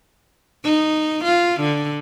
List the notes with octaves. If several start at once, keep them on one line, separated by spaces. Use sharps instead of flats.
D#4
F4
D3